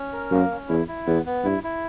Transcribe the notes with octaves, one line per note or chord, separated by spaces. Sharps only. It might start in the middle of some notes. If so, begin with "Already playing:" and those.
Already playing: C#4
A#4
F#2 A#3
C#4
E2 E4
E4
E2 B3
B3
G2 E4
E4